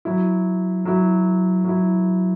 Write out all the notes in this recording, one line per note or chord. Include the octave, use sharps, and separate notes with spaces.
F#3 E4
F#3 E4
F#3 E4